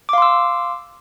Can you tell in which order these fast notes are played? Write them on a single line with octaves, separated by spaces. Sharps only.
D6 F5 C6 E6